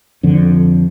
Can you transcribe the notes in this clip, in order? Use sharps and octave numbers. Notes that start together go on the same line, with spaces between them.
F2 D3